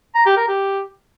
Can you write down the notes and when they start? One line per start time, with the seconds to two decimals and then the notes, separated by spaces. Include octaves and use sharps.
0.15 A#5
0.26 G4
0.37 A#4
0.48 G4